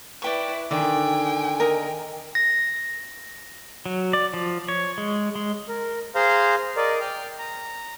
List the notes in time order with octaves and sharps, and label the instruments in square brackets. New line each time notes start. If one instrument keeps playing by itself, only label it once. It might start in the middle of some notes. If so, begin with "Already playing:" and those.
[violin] E4 B4 [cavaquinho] D5 G5 C#6
[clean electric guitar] D3 D#3 [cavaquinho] D5 [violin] G5 G#5
[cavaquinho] A#4 D#5
[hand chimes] A#6
[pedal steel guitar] F#3
D5
F3
C#5
G#3
G#3
[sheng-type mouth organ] A#4
G#4 C5 F5 A#5 C6
A#4 D5 D#5
G5 F6
A#5